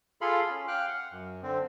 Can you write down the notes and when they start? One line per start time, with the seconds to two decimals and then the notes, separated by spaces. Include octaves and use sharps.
0.21 F4 G#4 A4 F5 B5 C6
0.50 C#4
0.68 F5 G5 D6 F6 F#6
0.88 F#5
1.11 F#2
1.43 D3 C4